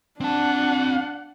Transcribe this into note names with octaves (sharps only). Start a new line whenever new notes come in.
C4 D4 F#5 A5